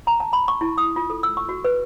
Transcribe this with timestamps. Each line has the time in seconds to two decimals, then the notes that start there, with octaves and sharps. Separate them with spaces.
0.07 A#5
0.20 A5
0.33 B5
0.48 C#6
0.61 E4
0.78 D#6
0.96 F4
1.10 A4
1.23 E6
1.37 C#6
1.49 F#4
1.65 B4